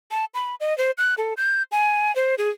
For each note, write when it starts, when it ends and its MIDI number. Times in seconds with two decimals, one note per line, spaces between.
0.11 0.25 81
0.34 0.55 83
0.60 0.76 75
0.78 0.91 72
0.98 1.14 90
1.18 1.34 69
1.37 1.63 91
1.72 2.14 80
2.16 2.35 72
2.38 2.50 68